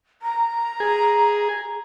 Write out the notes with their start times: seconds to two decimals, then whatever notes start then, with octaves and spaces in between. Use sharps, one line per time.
0.22 A#5
0.80 G#4